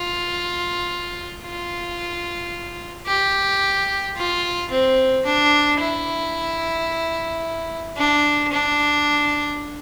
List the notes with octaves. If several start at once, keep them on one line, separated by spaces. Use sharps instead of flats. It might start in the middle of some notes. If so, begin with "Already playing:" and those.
Already playing: F4
F4
G4
F4
C4
D4
E4
D4
D4